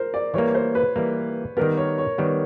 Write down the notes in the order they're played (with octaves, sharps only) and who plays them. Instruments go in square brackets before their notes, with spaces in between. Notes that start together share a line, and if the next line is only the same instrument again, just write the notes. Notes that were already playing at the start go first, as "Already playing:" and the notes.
Already playing: [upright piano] A#4 C5
D5
[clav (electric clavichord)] E3 G3 A#3 [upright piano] C#5
[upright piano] C5
B4
[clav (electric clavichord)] E3 G3 A#3
[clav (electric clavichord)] D#3 G3 B3 [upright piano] A#4
[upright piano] C#5
C#5
[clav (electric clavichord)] D#3 G3 B3 [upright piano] C#5